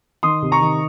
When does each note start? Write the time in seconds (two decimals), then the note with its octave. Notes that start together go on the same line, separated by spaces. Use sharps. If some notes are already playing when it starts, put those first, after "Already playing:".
0.23 D#3 C6 D#6
0.42 C3
0.52 A#5 C#6
0.61 D#3